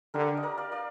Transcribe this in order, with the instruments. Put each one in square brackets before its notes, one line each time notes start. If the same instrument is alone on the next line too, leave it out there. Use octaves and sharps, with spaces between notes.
[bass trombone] D3 [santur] G4 A#4
[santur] D#5
A#4 D5
D5 F5
D5 F5